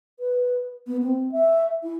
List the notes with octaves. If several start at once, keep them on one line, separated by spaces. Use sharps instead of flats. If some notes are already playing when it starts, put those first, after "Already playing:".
B4
B3
C4
E5
E4